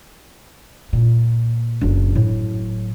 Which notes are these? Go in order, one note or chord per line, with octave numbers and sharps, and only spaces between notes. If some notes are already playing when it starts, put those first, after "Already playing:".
A#2
F#1 D4
A2 F#3